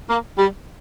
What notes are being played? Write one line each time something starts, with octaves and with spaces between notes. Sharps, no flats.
A#3
G3